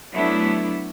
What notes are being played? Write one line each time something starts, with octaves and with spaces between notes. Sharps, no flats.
F#3 A3 B3 D4 E4